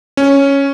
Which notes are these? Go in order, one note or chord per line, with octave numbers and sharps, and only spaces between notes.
C#4